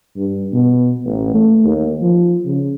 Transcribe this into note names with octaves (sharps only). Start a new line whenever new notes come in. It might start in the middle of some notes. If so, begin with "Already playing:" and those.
G2
B2
A1
A3
D#2
F3
C#3